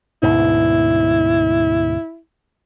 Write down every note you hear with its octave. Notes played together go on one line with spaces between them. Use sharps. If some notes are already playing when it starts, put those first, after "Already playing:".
D2 G#2 B2 E4